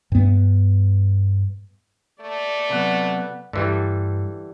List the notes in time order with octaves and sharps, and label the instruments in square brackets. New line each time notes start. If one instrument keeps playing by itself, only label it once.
[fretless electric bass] G2 B3
[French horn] A3 [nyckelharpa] D5
[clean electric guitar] C3 F#3 [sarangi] B3
[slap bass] G2 [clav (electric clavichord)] D3 E3 G3